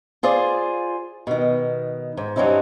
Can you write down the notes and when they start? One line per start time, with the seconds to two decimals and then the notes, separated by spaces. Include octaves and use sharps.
0.23 F4 G#4 C5 D5
1.27 B2 D#3
2.17 G#2
2.36 G2 F#3 C4 C#4 D#4 E4